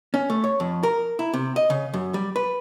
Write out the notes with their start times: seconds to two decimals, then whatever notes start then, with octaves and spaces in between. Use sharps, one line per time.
0.14 C#4
0.30 A3
0.44 C#5
0.60 F2
0.83 A#4
1.19 E4
1.34 C3
1.56 D#5
1.70 C#3
1.94 F#2
2.14 G3
2.36 B4